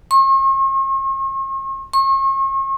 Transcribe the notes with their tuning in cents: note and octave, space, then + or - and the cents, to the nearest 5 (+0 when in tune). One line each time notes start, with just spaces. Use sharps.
C#6 -45
C#6 -40